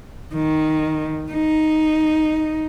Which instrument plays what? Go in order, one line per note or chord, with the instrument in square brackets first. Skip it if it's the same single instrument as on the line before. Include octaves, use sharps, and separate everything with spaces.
[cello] D#3
D#4